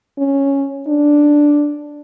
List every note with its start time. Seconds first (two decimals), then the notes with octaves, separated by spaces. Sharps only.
0.18 C#4
0.88 D4